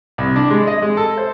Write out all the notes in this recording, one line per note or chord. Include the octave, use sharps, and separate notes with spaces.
C2
D4
G#3
D#5
G#3
A4
C5